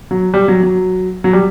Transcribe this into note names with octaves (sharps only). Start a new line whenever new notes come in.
F#3
G3
F#3
F#3
F#3
G3